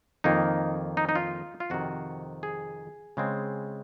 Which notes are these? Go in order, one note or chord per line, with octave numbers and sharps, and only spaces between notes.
F2 D#3 A#3 D#4
D#4
D#4
F4
F4
F2 C3 D#3 F#4
G#4
C#3 G#3 C4